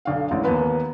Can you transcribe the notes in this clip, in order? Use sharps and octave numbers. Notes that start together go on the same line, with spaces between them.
B1 D3 F5
A1 G#2
D#2 A#3 B3 B4